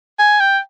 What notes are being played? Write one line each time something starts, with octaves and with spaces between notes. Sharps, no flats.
G#5
G5